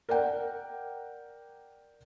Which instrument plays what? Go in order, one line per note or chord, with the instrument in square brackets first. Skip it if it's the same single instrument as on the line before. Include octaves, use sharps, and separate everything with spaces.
[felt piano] A#4 D5 F#5 G5